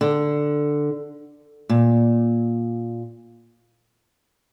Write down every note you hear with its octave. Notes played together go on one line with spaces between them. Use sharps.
D3
A#2